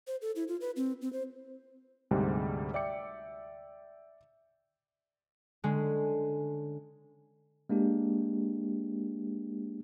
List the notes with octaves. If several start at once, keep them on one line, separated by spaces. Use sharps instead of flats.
C5
A4
E4
F4
B4
C4
C4
C5
D2 G#2 C3 G3 G#3
D5 E5 G5 D6 C#7
D3 G#3 C#4
G#3 A#3 D4 G4